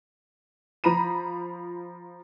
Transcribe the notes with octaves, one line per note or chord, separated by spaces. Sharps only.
F3 A#5 B5 D#7